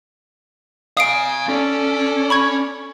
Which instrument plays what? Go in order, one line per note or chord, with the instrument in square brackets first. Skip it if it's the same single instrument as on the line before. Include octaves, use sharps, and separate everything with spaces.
[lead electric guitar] F5 G#5 [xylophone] D#6 C7 D7
[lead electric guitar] C#4 [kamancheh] A4 D5
[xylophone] B5 C#6 G#6